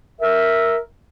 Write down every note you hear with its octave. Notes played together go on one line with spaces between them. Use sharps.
A#4 E5